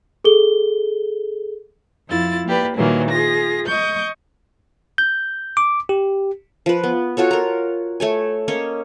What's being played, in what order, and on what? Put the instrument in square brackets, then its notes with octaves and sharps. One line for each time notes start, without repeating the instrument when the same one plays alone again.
[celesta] G#4 A4 G7
[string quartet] F2 E4 F4 A6
A#3 G4 B4 D5
A#2 D#3 E3 F#3 G3 A#3
F4 G#4 A#6
D#5 C#6 G6
[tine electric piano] G6
D6
G4
[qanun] F3 B4
B3
F4 F#4 A4 C#5
A#4 A#5
A3 C#5 G#5
A#3 C#4 C#5 D#5